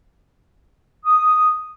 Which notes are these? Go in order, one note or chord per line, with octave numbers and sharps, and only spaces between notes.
D#6